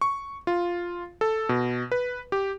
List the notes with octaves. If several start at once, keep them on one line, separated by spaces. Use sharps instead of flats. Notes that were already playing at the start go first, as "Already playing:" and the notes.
C#6
F4
A4
B2
B4
G4